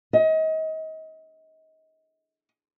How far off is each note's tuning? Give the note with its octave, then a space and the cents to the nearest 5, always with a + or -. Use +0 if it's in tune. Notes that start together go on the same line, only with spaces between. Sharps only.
D#5 +30